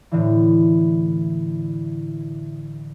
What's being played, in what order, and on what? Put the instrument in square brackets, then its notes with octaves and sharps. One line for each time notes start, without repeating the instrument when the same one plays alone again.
[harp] A2 D3 E3